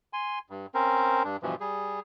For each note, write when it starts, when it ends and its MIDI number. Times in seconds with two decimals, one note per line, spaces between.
0.13 0.39 80
0.13 0.39 84
0.50 0.66 43
0.74 1.23 60
0.74 1.23 61
0.74 1.23 70
0.74 1.23 72
1.24 1.37 43
1.24 1.37 62
1.42 1.55 43
1.42 1.55 47
1.42 1.55 52
1.42 1.55 53
1.60 2.00 55
1.60 2.00 68